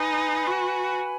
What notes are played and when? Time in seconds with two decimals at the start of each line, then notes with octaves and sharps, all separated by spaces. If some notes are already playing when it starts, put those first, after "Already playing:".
Already playing: D#4 B4 G#5 B5
0.47 F#4